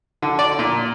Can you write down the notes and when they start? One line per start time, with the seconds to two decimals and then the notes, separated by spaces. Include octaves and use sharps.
0.22 D3
0.39 D5
0.59 A#2